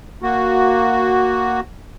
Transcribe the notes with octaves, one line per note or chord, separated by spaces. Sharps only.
A#3 F#4